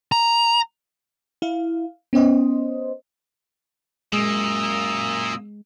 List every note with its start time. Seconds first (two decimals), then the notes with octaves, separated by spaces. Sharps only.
0.12 A#5
1.42 E4 F5
2.13 B3 C#4 C5 D#5
4.13 F#2 A#2 G#3 A#3 D#6 E6